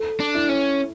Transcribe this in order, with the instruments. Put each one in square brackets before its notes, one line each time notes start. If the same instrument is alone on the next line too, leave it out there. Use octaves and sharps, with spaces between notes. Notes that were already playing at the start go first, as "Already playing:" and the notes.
Already playing: [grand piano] A4
[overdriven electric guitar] D4
[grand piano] E4
[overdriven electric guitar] C#4